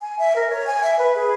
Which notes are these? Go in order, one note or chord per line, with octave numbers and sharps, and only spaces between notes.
G#5
E5
A#4
C#5
G#5
E5
B4
G#4